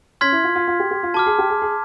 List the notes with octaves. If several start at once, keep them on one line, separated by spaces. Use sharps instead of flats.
C#4 C6 F6 G#6 B6
E4
F4
F4
F4
G4
G4
F4
F#4 A5 D6 F6
G#4
G4
G#4
G#4